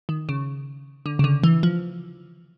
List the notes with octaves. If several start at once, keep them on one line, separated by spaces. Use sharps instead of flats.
D#3
C#3
D3
C#3
D3
E3
F3